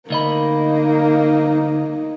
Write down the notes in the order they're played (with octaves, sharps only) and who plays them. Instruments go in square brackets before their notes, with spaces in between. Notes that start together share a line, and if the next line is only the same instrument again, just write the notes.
[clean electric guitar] D2 D#5 B5 [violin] A#3 [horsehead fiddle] D#4